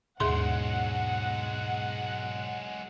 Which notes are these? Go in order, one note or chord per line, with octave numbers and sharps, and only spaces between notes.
D#2 G#2 B2 F#3 G#3 G#4 F#5 C6